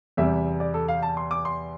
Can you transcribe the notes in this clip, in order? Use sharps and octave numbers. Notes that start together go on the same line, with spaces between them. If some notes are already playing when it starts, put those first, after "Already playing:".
E2 C3 G3 E5
D5
A4
F5
A5
C6
D6
C6